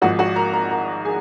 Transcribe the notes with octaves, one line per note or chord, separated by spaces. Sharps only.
G#1 G#2 F3 F#4 F#5
F#4 F#5
A#4 A#5
A#4 A#5
A#4 A#5
G#4 G#5